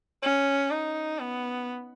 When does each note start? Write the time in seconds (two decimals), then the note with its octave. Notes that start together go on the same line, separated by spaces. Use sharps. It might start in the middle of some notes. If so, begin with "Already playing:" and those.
0.23 C#4
0.71 D#4
1.19 B3